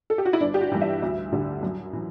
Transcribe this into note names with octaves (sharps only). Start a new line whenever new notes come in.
A4
G4
F#4
E4
G1 D4
G4
F#4
G2 E3
E5
D2
D3 G3
F#2
E3